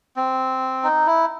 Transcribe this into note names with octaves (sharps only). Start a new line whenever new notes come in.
C4
D#4
E4